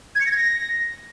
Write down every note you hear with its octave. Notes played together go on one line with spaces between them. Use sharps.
G#6
C#7
A#6
G#6
A#6